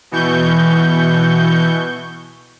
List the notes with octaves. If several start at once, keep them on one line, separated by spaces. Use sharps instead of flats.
B2 E3 C#6 G6